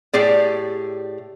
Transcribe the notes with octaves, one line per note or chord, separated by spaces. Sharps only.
A2 G4 G#4 D5